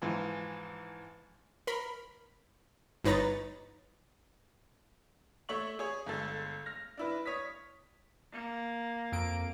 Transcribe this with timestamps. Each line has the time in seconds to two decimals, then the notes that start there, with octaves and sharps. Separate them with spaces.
0.02 G#2 E3 F3
1.67 A#4 B5
3.04 G1 D#4 B4 C#5 A#5 A6
5.49 A3 C#5 E5 C#6 F#7
5.79 G#4 C#5
6.06 G1 G#3 A4
6.66 F6 A#6
6.97 D4 E4 B4
7.26 C#5 D#6 B6
8.32 A#3
9.12 F2 A#4 D7